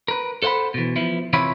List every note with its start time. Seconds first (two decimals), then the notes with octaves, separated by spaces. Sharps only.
0.08 A#4 B4
0.42 A4 C5 F5 F#5 B5
0.74 B2 E3
0.96 F3 B3 E4
1.33 C3 E3 F4 C#5 E5 B5